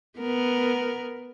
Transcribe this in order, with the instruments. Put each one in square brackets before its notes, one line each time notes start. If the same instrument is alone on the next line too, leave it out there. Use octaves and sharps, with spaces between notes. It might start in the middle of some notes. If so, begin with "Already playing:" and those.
[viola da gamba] B3 A#4